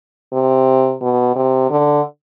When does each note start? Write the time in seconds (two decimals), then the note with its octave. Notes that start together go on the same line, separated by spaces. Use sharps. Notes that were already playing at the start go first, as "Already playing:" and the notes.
0.33 C3
1.02 B2
1.36 C3
1.70 D3